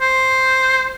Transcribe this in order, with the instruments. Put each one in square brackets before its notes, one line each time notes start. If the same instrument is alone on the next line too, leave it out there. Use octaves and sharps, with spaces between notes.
[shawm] C5